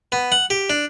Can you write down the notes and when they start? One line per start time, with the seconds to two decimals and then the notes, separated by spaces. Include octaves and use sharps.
0.12 B3
0.32 F#5
0.50 G4
0.70 D4